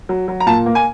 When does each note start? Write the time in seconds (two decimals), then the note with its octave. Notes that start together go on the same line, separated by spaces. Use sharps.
0.09 F#3
0.28 F#3
0.40 A#5
0.46 A#2 A5
0.66 A#3
0.75 G#5